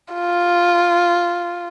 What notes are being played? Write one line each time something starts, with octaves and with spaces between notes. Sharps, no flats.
F4